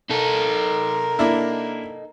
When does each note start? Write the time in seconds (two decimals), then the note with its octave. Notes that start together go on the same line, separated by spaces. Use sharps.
0.10 D#4 A4 A#4
1.19 A#3 D4 E4